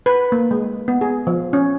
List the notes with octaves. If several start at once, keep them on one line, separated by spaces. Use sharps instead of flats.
B4
A#3
G#3
B3
G#4
F3
C#4